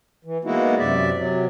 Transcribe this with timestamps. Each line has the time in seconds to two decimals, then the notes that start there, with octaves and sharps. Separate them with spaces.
0.25 E3
0.45 G#3 A#3 B3 D#4 E4 F#4
0.79 F#2 C3 D5 E5
1.18 C3 F#3